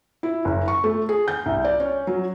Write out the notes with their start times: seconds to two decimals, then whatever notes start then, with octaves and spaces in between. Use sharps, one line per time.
0.23 E4
0.45 F#1
0.68 C#6
0.84 A3
1.09 G#4
1.28 G6
1.46 C2
1.65 D5
1.80 C#4
2.07 F#3